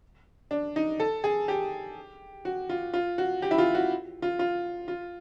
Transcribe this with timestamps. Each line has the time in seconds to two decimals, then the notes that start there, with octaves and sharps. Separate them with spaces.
0.51 D4
0.76 D#4
1.00 A4
1.24 G#4
1.48 G4
2.45 F#4
2.69 F4
2.93 F4
3.18 F#4
3.42 G4
3.51 E4
3.58 F4
3.75 F#4
4.22 F4
4.39 F4
4.88 F4